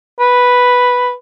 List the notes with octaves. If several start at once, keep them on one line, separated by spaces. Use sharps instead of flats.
B4